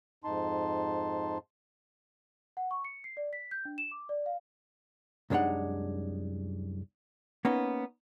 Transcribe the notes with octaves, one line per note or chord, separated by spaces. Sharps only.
F2 G#2 D#4 A5 C6
F#5
C#6
C#7
C7
D5
B6
G6
D4
E7
D6
D5
F5
C2 F#2 G#3 D4 D#4 F#5
A#3 B3 C#4 D#4